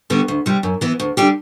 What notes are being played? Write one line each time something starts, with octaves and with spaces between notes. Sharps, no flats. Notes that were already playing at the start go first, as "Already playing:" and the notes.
D3 G3 B3 F#4
D2
C3 G3
F#2
E3 B3 E4
D2
D3 G3 D4 G4